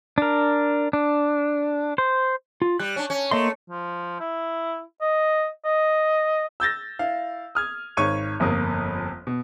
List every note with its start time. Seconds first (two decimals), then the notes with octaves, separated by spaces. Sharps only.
0.18 D4 A#4
0.93 D4
1.98 C5
2.62 F4
2.79 G3 F#6
2.96 C#4 D4
3.10 C#4
3.31 A3 A#3 D#5 C6
3.70 F3
4.20 E4
5.01 D#5
5.65 D#5
6.60 E6 G6 A6 A#6
6.99 E4 F5
7.55 D#6 F6 G#6
7.97 G#1 C#5 C#6 G#6 D#7
8.40 G1 F2 A#3 D#6
9.27 B2